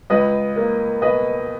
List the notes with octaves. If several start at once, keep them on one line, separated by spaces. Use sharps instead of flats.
C#2 B4 D#5
A#3
B2 B4 D#5